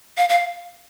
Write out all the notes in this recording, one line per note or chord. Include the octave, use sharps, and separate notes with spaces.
F5
F5